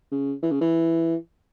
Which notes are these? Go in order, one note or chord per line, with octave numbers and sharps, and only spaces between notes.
C#3
E3
C#3
E3